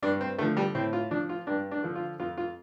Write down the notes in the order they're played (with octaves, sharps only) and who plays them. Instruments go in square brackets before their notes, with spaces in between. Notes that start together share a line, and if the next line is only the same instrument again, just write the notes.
[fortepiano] G2 D4
C4
D3 F3 A3
G3
A2 C4
F4
F3 D4
F4
G2 D4
D4
D3 F3
F4
F2 F4
F4